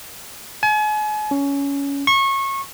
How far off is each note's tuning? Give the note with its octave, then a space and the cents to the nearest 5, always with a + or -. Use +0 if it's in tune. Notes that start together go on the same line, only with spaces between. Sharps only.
G#5 +40
C#4 +15
C#6 -25